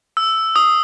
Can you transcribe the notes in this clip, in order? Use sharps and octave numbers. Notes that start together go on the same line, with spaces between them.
E6
D#6